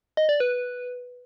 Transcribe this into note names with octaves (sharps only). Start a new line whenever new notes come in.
D#5
D5
B4